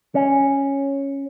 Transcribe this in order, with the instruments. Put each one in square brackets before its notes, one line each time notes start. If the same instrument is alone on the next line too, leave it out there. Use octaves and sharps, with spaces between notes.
[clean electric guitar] C#4